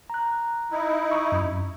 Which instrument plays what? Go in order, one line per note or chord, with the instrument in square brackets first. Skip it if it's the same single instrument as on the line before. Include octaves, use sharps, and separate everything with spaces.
[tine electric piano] A#5 F#6
[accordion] D#4 E4
[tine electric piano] C#6 D#6
F#2